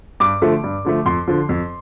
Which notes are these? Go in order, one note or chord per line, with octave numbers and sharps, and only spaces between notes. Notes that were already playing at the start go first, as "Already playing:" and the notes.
G2 D6
D3 F3 A3
G2
D3 F3 A3
F2 C6
D3 F3
F2